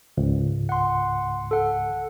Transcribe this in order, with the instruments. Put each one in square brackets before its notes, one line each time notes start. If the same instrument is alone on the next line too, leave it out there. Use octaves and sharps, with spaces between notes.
[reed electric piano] C#2 G#2
[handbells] F#5 C6
A4 F#5